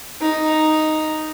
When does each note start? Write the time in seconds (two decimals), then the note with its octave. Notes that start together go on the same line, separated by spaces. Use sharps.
0.21 D#4